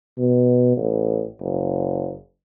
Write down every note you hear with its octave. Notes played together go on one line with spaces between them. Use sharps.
B2
A1
F#1